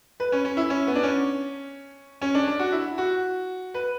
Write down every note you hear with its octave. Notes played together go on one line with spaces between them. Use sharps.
B4
C#4
C#4
E4
C#4
B3
D4
C#4
C#4
D4
D4
F#4
E4
F#4
B4